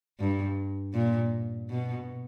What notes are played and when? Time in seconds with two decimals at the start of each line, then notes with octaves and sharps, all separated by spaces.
0.20 G2
0.94 A#2
1.70 B2